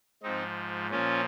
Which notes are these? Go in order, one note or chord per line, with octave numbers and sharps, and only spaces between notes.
G#2 F3 C4 D#4
A#2 F3 C#4 F4